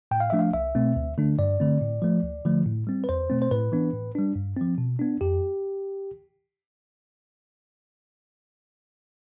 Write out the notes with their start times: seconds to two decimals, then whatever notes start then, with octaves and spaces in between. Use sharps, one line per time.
0.11 A2 G5
0.20 F5
0.30 F3 A3 D4 E5
0.39 F5
0.53 C2 E5
0.75 B2 A3 C4
0.96 D2
1.18 D3 A3 D4
1.39 G2 D5
1.60 D3 A3 C4
1.81 A2
2.02 F3 A3
2.23 D2
2.45 D3 F3 A3
2.66 A2
2.87 G3 C4
3.04 B4
3.09 E2 C5
3.30 B2 A3 C4
3.42 C5
3.51 A2 B4
3.72 E3 B3 D4
3.93 A2
4.15 G3 D4
4.36 G2
4.56 F3 C4
4.78 B2
4.99 B3 D4
5.21 F2 G4